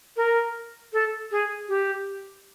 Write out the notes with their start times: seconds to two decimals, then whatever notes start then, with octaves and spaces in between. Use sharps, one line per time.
0.17 A#4
0.93 A4
1.31 G#4
1.69 G4